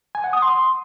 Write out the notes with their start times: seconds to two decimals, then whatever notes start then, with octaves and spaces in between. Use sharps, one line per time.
0.15 G#5
0.24 F#5
0.33 D#6
0.42 C6